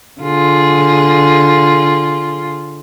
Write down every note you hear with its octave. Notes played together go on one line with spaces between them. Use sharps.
D3 F4 G#4